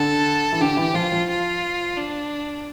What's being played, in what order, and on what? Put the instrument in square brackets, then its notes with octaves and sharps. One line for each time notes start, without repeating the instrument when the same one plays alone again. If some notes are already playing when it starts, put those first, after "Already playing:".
Already playing: [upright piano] D3 [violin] A4
[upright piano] E3
[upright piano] D3 [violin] G4
[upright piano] E3
[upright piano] F3 [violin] F4
[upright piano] F3
[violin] F4
D4